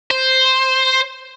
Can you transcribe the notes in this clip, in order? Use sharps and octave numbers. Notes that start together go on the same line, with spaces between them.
C5